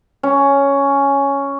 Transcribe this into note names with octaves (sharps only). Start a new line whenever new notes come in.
C#4